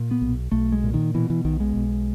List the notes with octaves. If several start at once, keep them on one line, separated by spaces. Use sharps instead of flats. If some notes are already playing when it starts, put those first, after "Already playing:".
Already playing: A#2
B3
B1
B1 A3
G#3
A#2
D#3
B2 E3
E3
B1 D#3
G#3
B1